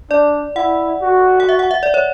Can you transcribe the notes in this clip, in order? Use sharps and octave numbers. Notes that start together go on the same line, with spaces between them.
D4 D5
E4 F#5
F#4
F#5
E5
F#5
E5
D5
C#5